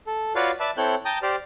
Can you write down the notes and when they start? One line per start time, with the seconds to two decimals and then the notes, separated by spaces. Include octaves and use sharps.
0.07 A4
0.35 F4 F#4 B4 C#5 D5 F5
0.60 B4 D5 E5 A5
0.77 C4 E4 A4 C#5 F#6 G6
1.05 G5 A5 A#5 D#6 G6
1.22 G4 C5 D5 F6